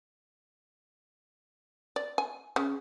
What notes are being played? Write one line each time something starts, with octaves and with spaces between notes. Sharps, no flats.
D5
G#5
C#3